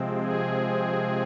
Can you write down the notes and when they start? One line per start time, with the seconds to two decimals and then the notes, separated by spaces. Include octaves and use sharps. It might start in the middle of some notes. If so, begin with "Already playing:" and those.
Already playing: C3 F3 G#3 C4
0.17 G#4